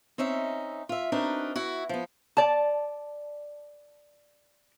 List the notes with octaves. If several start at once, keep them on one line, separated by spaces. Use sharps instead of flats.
C4 C#4 D#4 E5
F4 E5
C4 D4 D#4 F#4 A#4 B4
E4 F#4
F3 B3
D5 A5